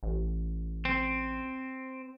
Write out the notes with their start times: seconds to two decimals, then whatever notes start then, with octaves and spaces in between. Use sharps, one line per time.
0.03 A1
0.85 C4